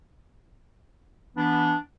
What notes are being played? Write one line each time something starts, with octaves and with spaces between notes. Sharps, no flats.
E3 B3 D4